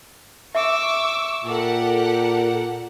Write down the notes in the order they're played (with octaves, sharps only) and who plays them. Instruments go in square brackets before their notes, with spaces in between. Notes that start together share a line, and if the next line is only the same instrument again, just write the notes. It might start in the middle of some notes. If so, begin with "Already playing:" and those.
[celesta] E5 [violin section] C#6 [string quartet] D6 E6
[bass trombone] A#2 [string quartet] G4 [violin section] A4 A#4 F#5